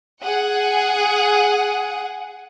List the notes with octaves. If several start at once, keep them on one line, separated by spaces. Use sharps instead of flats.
G#4 F#5